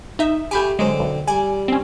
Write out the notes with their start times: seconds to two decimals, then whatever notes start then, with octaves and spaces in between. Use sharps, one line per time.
0.19 D#4 E5
0.51 A3 F4 G4 G#5 B5 G6
0.79 D3 F#3 G#3 C4
1.00 B1
1.28 G3 G#5
1.68 C4 C#4